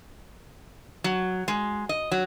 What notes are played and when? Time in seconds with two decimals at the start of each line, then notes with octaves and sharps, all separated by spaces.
1.04 F#3
1.48 G#3
1.89 D#5
2.12 F#3